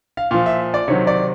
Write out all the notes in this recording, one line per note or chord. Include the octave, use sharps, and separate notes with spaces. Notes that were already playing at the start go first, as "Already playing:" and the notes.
F5
A#2 F3 F5
E5
D5
C3 D#3 F#3 C#5
D5